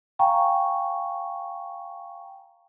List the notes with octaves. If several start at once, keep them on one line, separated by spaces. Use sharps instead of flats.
F5 G5 G#5 A#5 C#6